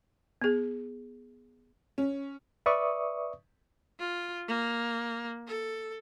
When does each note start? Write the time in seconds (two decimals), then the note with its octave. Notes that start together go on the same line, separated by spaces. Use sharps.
0.42 B3 G#4
1.98 C#4
2.66 B4 D5 E5 C#6 D#6
4.00 F4
4.48 A#3
5.48 A4